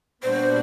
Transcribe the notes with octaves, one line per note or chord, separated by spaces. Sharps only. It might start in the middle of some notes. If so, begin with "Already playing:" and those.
A#2 G3 B3 D4 F#4 C5